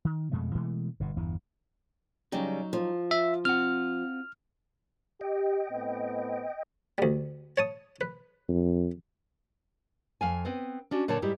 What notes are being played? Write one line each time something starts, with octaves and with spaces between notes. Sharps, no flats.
D#3
F2 B2 G#3 A3
B2 E3 G#3 A3
G1 G2 B2
G1 E2 E3
C#3 F#3 G3 D#4
F3
F4 E5
C4 F4 F#5 F6
G4 D#5 G5
A2 B3 C4
D2 G3
C#5 A5 D#6
B4
F2
F2 F5 G#5
B3 C4 B4
C#4 D4 F#4
A#2 D3 A#4 C#5 A5
G#2 G3 E4 G4